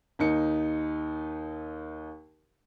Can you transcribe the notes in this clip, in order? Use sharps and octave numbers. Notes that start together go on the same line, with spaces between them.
D#2 D#4 C#7